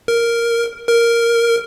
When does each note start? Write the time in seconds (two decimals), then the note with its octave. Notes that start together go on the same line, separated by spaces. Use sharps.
0.08 A#4
0.89 A#4